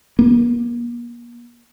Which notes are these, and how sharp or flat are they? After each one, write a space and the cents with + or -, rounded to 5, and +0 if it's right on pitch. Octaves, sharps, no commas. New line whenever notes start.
A#3 +40